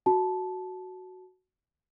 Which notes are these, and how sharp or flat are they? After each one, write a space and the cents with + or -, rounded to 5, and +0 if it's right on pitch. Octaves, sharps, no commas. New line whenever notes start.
F#4 +0 A5 -15